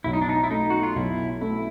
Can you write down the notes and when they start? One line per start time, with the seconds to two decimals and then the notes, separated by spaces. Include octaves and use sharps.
0.04 B1 E4
0.13 D#4
0.22 D4
0.29 D#4
0.43 E4
0.50 A3 D#4
0.70 F#4
0.83 F4
0.96 B1 E4
1.41 A3 E4